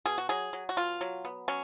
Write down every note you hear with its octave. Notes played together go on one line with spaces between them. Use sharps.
B2 G#4
F#4
F#3 G#4
F#3
F#4
B2 F4
F#3
B3
F#3 C#4